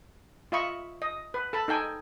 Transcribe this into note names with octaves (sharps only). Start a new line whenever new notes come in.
F4 D#5 E5 B5 C#6
D#5
B4
A4 A5 B5
D#4 A4 G5 G#5